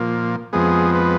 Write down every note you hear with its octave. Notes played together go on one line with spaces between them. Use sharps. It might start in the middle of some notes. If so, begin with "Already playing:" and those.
Already playing: A#2 F3 A#3
F2 F3 G#3 B3 G#4
B4